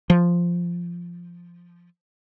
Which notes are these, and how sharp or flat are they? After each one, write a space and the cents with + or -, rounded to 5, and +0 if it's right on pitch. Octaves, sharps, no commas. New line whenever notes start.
F3 -5